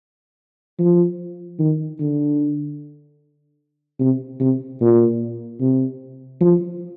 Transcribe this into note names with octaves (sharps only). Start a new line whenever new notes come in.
F3
D#3
D3
C3
C3
A#2
C3
F3